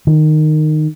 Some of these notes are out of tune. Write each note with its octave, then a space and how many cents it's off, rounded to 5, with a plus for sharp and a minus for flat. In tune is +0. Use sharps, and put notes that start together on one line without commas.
D#3 -15